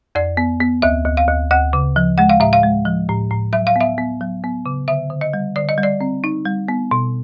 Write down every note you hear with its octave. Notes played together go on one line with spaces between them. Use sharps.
F2 D5
B3
B3
D2 E5
D2
F5
D2
D2 F#5
C#3
F3
G#3 F#5
F5
A2 E5
F5
G#3
F3
A2
A2
F#3 E5
F5
B3 E5
B3
F#3
B3
C#3
D3 E5
D3
D#5
G3
D3 D5
D#5
G3
D5
C4
D#4
G3
B3
B2